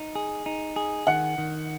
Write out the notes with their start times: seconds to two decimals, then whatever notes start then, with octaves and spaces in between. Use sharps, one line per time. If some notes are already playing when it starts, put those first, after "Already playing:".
Already playing: D#4
0.15 G#4
0.46 D#4
0.76 G#4
1.07 D#3 F#5
1.38 D#3